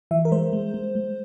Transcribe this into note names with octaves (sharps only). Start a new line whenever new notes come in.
E3 E5
A#4
G#3 C5
G#3
G#3
G#3